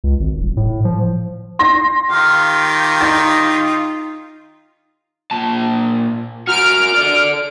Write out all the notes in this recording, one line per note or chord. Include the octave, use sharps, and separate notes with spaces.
C#2
G#1
D#1
A2
F3
C6 A#6
D#3 F4 G4 F5
D#4 A6
A#2 A5
F#4 A#4 F6 D7
A4 D5